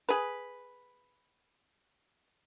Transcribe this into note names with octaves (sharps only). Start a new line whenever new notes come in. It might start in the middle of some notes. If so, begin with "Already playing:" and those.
G#4 B4